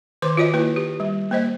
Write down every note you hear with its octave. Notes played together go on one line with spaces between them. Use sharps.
D#3 B4 C5 C6 D6
F4 F#4 C#5 D#5
A#3 E4 B4
G4
G3
A#3 C5 D#5